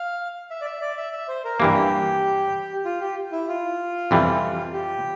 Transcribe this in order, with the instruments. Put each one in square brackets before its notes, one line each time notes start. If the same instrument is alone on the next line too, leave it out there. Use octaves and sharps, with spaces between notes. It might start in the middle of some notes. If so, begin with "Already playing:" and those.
Already playing: [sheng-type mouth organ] F5
E5
D5
E5
D5
E5
E5
C5
A#4
[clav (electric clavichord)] G2 E3 A#3 [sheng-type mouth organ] G4
[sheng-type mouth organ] F4
G4
E4
F4
[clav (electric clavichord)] F2 C3 E3 G3
[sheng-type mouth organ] G4